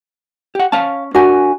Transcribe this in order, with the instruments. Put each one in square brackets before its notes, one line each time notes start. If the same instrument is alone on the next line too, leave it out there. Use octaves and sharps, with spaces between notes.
[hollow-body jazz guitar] G4 F#5
[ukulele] C#4 [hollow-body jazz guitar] C#5 F5 A5
[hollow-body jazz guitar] D4 A#4 [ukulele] F#4 G#5